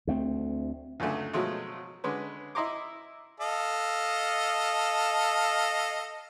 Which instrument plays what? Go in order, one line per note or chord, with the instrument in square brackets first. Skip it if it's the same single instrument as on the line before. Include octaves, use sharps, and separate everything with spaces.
[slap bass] D2 A3 C4
[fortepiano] C#2 F#2 D3 A3
B2 F3 F#3 G#3 A3
D3 G#3 C#4 B4
E4 D#5 A#5 C6 D6
[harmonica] A4 D#5 F5